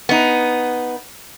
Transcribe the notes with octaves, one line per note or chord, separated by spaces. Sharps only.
B3 D#4